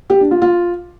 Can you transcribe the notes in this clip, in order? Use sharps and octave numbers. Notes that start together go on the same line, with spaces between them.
G4
D4
F4
F4